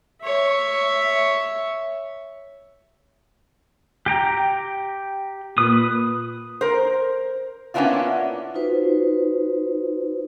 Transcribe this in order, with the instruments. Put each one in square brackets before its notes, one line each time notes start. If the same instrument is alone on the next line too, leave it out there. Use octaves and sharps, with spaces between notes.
[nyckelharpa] C#5 E5
[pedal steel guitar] G4 G5 A#5
[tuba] A#2 [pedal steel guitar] B4 D#6
[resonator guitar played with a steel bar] A#4 C5
A#3 B3 C#4 D4 E4 F4
[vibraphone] D#4 F4 F#4 B4 C5